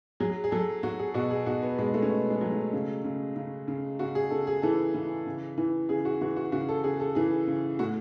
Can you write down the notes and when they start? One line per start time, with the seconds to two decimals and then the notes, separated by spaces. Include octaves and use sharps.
0.20 F#3 G#4
0.44 G#4
0.51 F#3 A4
0.83 F#3 F#4
0.99 G#4
1.14 B2 F#4
1.30 G#4
1.46 B2 F#4
1.62 B3
1.78 B2 G#3
1.94 A3
2.02 C#4
2.09 B2 B3
2.30 G#3
2.41 F#3
2.52 A3
2.73 C#3
3.04 C#3
3.36 C#3
3.68 C#3
3.99 C#3 F#4
4.15 G#4
4.31 C#3 A4
4.47 G#4
4.62 E3 A4
4.94 E3
5.26 C#3
5.58 E3
5.89 C#3 G#4
6.05 F#4
6.21 E3 F#4
6.36 F#4
6.52 C#3 F#4
6.69 A4
6.84 C#3 G#4
7.00 A4
7.15 E3 G#4
7.47 C#3
7.79 A2 F#4